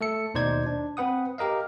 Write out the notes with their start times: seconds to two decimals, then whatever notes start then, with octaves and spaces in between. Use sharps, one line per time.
0.01 A3 A4 C#7
0.34 D#2 B2 D#4 C5 D5 G#6
0.66 D4
0.97 C4 B4 F#5 D#6
1.38 G4 A#4 D#5 F5